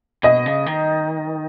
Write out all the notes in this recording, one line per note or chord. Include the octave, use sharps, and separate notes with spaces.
B2 D#5
C#3
D#3